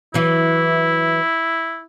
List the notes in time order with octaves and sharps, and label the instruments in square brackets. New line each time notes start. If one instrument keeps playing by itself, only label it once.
[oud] E3 F#3 [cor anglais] E4